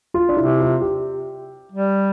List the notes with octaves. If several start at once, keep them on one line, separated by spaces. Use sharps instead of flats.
F4
D4
C3 E4
F4
G4
G3